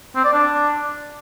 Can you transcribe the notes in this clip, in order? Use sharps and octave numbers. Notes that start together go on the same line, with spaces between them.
C4
D5
D4